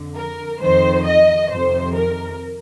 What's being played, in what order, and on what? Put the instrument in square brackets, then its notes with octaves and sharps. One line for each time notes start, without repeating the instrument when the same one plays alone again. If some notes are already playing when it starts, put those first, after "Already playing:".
Already playing: [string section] F2 D3
A#4
F2 D#3 C5
D#5
F2 C3 D#3 C5
A#4